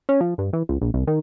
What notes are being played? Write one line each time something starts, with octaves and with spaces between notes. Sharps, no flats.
C#4
F3
G2
E3
C#2
A#1
C2
D#3